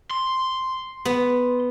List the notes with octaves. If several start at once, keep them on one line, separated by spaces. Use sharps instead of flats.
C6
B3